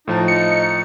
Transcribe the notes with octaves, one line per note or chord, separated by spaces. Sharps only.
A2 F3 D#4 A5
C#7